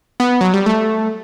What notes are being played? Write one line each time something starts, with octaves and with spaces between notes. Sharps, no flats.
B3
F#3
G3
A3